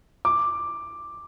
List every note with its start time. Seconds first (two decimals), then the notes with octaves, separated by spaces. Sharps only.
0.25 D6